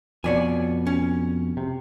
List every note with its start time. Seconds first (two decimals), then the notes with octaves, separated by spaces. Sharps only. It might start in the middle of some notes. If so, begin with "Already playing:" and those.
0.24 F2 B2 C#5 D5 G#5
0.87 C#4
1.57 C3